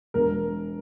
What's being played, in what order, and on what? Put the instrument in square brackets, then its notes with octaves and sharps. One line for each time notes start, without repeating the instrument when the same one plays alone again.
[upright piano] E1 A#4